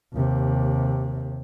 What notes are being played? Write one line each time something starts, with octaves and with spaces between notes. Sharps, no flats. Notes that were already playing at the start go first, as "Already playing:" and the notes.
D#2 C3